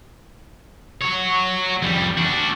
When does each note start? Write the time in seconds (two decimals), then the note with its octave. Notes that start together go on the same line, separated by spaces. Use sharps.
1.02 F#4 C#5
1.82 F2 G3
2.17 D4 F#4